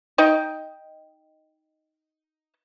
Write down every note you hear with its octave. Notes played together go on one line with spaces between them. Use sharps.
D#4 D#5 G5